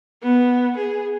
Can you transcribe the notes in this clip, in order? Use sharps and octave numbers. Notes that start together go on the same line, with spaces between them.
B3
G#4